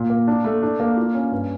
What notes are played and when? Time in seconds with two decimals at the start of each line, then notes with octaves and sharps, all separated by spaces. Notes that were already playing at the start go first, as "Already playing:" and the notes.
Already playing: A#2
0.10 A#3
0.28 D4
0.45 A3
0.62 D4
0.80 A#3
0.97 F4
1.15 C#4
1.32 G2